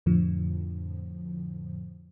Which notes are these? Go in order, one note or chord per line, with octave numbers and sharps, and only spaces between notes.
F2 A2 D3 F3